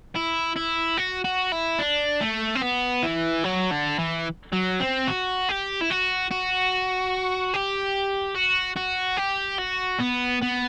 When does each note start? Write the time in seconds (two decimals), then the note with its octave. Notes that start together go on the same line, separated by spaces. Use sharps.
0.15 E4
0.56 E4
0.97 F#4
1.25 F#4
1.52 E4
1.79 D4
2.21 A3
2.55 C4
2.62 B3
3.03 E3
3.44 F#3
3.71 D3
3.99 E3
4.53 F#3
4.80 C4
5.08 F#4
5.49 G4
5.81 E4
5.90 F#4
6.31 F#4
7.54 G4
8.36 F#4
8.77 F#4
9.17 G4
9.59 F#4
10.00 B3
10.42 B3